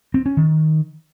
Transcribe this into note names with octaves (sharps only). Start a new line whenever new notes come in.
C4
C#4
D#3